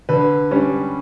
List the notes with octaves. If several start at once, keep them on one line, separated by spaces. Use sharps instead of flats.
D3 B4
G3 C#4